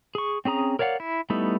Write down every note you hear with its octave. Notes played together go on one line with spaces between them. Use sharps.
G#4 C#6
C4 C#4 G#4 A#5 D#6
A#4 C#5 D5 F5 F#5
E4
G3 A3 B3 D#4 E4